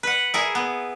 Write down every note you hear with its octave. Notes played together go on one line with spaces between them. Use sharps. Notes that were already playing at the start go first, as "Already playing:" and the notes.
B4 F#5
E4 G#4 A#4
B3